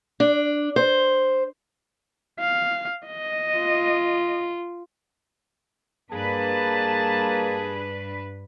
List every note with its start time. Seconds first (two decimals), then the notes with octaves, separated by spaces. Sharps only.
0.20 D4
0.76 C5
2.39 F5
3.06 D#5
3.57 F4
6.12 G2 A#3 D4 G#4 B4 A5